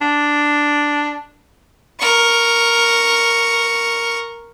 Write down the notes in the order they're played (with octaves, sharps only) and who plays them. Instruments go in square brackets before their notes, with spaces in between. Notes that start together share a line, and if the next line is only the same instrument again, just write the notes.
[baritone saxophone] D4
[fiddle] A#4 C#6